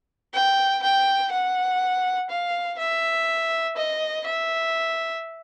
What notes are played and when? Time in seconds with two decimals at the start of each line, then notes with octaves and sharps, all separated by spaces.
0.34 G5
0.83 G5
1.31 F#5
2.30 F5
2.79 E5
3.77 D#5
4.26 E5